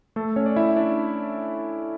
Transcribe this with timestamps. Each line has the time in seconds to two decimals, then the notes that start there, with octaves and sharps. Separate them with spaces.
0.16 A3 A4
0.36 C#4 C#5
0.46 D5
0.56 E4 E5
0.76 D4 D5